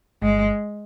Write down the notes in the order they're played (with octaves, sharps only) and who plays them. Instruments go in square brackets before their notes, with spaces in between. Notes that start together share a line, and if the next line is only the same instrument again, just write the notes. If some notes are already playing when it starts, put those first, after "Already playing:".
[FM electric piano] G1 [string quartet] G#3